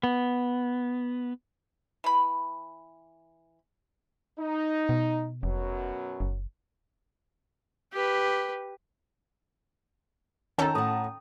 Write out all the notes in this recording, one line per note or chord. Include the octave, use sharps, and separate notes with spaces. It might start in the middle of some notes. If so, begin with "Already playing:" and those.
B3
E3 B5
D#4
B2
F1 F#2 B2 F#3
F#1
G4 B4
D#3 C#4 A4 G5 A5 A#5
A2 F#5 D#6